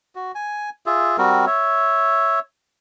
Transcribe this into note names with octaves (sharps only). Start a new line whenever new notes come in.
F#4
G#5
F4 G#4 E5
G3 C4 F#4 A#4
C#5 E5